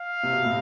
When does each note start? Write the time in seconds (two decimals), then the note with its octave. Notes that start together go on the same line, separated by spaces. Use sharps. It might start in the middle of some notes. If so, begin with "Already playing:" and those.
Already playing: F5
0.23 C3
0.33 B2
0.44 A2 C3